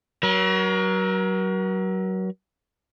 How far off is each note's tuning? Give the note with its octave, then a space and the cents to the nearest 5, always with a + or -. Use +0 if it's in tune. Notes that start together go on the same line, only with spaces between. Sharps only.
F#3 +25 A#4 +40